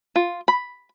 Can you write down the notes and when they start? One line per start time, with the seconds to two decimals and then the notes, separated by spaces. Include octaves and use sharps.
0.16 F4
0.48 B5